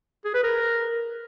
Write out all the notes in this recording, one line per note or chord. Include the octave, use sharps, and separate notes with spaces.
G#4
B4
A#4